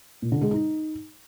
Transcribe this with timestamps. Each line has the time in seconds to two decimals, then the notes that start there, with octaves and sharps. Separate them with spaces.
0.22 A#2
0.32 D3
0.41 G#3
0.51 D#4